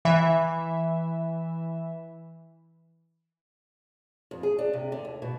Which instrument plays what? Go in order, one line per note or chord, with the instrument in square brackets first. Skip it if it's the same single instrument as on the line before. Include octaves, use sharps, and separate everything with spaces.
[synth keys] E3 E5
[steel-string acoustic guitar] F2
G#4
D4
C3
D3
D#2
B2